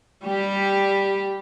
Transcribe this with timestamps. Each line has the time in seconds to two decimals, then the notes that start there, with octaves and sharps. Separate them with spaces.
0.24 G3 G4